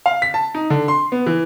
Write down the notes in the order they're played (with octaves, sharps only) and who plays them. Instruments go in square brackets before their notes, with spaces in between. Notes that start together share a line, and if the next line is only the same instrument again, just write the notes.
[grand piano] F5
B6
A5
D#4
D3
C6
B3
E3